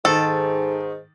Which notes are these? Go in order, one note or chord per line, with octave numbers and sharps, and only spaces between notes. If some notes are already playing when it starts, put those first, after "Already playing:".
G#2 D#3 A4 A6